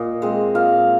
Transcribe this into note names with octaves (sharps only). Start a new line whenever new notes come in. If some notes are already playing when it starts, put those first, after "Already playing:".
Already playing: A#2 D#5
G#3 C4
A#2 F5